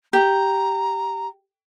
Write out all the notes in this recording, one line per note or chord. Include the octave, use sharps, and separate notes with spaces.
G4 A#5